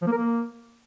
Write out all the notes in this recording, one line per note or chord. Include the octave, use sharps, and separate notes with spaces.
F3
A#3
A#4
A#3